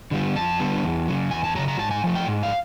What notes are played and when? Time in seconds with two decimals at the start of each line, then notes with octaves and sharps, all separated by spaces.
0.11 D3 G3 B3
0.36 F2 A5
0.60 D3 G3 B3
0.83 E2
1.08 C#3 F#3
1.31 E2 G#5
1.44 A5
1.55 C#3 F#3 A#5
1.68 A#5
1.79 G#2 A5
1.91 G#5
2.04 F3 A3
2.15 G5
2.28 G#2
2.43 F5